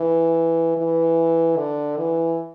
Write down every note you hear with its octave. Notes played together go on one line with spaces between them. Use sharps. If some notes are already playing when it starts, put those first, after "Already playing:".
Already playing: E3
E3
D3
E3